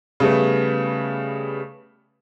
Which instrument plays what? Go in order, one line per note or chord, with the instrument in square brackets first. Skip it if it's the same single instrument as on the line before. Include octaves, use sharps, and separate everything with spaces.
[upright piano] C#3 G3 A3 B3